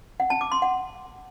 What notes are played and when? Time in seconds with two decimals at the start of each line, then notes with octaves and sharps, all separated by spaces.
0.20 F#5
0.30 A5
0.41 D6
0.52 C6
0.62 F#5